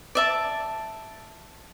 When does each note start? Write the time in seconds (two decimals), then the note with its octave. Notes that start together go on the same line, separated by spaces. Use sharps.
0.15 D5 E5 A5